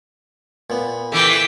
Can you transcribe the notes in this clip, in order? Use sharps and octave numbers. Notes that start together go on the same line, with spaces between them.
A#2 B3
E3 A3 G4 G5